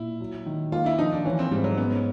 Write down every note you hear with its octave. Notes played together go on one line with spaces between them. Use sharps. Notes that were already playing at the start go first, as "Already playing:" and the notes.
Already playing: A#2 E4
F#3
D#3
A#3 F4
E4
F3 D#4
D4
E3 C#4
C4
G#2 G3
F#3
B3 C#4